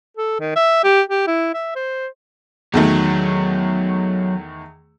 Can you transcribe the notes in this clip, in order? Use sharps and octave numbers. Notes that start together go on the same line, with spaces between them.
A4
D#3
E5
G4
G4
E4
E5
C5
E2 D#3 F#3 A3